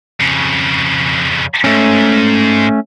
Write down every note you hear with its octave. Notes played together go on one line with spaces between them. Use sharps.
F2 C#3
G#2 A3 C#4